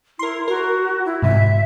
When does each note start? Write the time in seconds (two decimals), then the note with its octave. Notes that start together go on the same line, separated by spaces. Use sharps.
0.19 E4 A#4 C6
0.48 F#4 A#4
1.05 E4
1.22 G#2 C3 E5